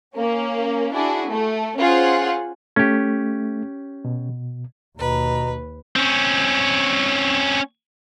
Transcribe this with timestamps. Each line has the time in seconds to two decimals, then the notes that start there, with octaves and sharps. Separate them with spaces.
0.16 A#3 C#4
0.94 D4 E4 F#4 G#4
1.30 A3
1.78 C#4 F4 G#4 C5 F#5 G#5
2.76 A3 C#4 G4
4.05 B2
4.98 D#2 B2 B4 A#5
5.96 C4 C#4